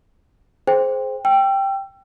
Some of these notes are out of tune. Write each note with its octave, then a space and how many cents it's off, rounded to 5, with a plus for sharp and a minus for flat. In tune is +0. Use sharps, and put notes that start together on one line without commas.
G#4 +30 C5 +0 G5 +15
G5 +0 E6 +35